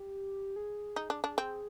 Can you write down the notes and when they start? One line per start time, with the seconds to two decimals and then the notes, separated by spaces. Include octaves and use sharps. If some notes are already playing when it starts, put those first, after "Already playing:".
Already playing: G4
0.56 G#4
0.96 D#4
1.10 D4
1.24 D4
1.38 C4